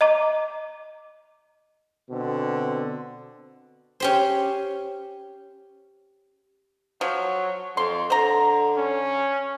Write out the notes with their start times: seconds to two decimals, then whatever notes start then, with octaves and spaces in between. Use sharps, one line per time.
0.01 D#5 A#5 D6
2.10 B2 D3 C4
4.00 C#4 G4 C5
7.01 F3 F#3
7.77 F2 C6
8.10 D3 C5 A#5
8.77 C#4